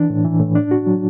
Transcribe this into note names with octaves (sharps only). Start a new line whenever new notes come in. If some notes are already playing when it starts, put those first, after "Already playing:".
Already playing: E3 D4
A2
E3
A2
D4
F#4
F#3